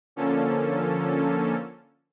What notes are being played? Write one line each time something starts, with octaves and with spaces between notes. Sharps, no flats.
D3 F3 A#3 C#4 A4